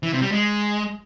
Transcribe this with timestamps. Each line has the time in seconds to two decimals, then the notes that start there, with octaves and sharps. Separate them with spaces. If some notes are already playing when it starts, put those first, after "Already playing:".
0.03 E3
0.12 C3
0.22 G3
0.32 G#3